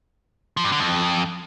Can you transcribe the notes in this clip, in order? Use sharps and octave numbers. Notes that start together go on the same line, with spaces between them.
F3
G2
D3
F2